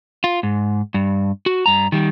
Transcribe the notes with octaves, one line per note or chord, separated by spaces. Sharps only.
F4
G#2
G2
F#4
G2 A#5
D#3 G3